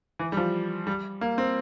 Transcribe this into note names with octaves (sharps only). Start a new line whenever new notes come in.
E3
G3
F3
G3
A#3
C4